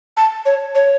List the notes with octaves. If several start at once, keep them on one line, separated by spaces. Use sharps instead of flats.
A5
C#5
C#5